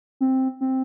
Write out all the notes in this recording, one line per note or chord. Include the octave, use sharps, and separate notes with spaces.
C4
C4